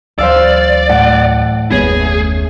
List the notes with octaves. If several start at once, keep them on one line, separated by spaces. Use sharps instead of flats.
D2 E3 F#3 C5 D5 F5 E6
A2 F#5
F#1 D#2 A#3 B3 G#4 C#5 D#5
A3 C#4